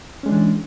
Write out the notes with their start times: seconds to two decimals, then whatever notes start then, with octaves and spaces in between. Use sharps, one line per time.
0.23 C#4
0.26 G#3
0.29 D4
0.31 E3